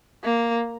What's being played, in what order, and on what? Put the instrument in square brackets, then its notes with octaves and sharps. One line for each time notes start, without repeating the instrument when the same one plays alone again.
[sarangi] A#3